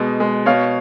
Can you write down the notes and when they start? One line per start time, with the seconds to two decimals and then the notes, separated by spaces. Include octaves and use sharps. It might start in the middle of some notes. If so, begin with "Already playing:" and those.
Already playing: B2 G#3
0.20 G#3
0.46 B2 C#5 F5